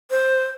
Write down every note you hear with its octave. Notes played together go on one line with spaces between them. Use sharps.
C5